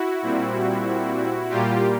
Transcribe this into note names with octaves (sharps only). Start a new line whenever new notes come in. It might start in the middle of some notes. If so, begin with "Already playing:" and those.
Already playing: E4 F#4
A#2 G3 C4
A#2 G3 A#3 F4 G4